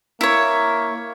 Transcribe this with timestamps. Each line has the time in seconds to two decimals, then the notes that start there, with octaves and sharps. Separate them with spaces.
0.21 A#3 E4 C#5